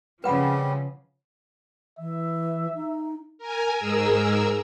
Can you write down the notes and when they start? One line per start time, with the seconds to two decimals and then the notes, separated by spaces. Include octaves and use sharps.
0.24 C#3 F3 G3 C4 B4 F#5 B5
1.99 E3 E5
2.75 D#4
3.38 A#4 G#5
3.76 G#2 G#4 A#4 E6